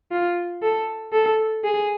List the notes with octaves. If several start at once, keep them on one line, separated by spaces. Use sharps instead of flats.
F4
A4
A4
G#4